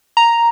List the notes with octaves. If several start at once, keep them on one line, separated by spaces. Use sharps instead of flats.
A#5